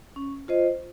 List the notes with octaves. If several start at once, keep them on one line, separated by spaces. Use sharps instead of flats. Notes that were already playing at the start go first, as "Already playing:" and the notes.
C#4
F4 C5 D#5